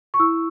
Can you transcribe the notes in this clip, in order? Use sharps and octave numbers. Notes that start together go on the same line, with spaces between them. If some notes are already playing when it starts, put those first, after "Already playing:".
C#6
E4 E6